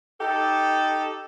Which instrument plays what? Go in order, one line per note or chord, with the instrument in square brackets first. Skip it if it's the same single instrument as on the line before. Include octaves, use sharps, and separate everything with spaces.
[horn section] D#4 G4 A4